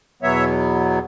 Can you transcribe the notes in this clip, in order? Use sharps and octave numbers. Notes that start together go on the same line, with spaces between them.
E2 B2 F#3 B3 C#5 E5